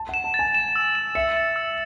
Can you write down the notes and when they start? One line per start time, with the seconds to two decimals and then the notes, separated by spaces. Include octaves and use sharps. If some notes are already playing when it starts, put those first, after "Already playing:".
Already playing: A5
0.09 F#5 E7
0.24 A5
0.34 A6
0.39 G#5
0.54 E7
0.76 E6
0.95 E7
1.15 E5 C#7
1.36 A6
1.56 E6